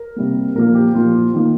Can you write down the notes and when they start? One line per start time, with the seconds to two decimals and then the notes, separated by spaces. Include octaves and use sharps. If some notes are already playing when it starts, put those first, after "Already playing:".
Already playing: A#4
0.16 C3 G3 A#3
0.55 A#2 F3 A#3 A#4
0.75 G4
0.95 A#2 F3 A#3 F4
1.34 D#3 A#3